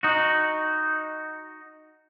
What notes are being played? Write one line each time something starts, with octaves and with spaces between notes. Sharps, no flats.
D#4 F#4